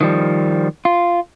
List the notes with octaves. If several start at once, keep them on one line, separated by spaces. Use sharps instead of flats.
D#3 F3 G3
F4